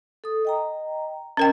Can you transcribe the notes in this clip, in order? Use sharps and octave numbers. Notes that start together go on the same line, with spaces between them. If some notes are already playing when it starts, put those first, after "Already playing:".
A4 D#6
D#5 G5 A#5
C#4 A#4 D#5 G5